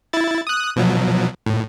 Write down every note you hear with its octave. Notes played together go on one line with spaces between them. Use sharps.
E4 A6
D#6 F#6
B2 F3 F#3
A2